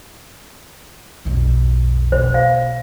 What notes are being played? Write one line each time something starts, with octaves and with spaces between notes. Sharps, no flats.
B1 F2
B2 C5
F5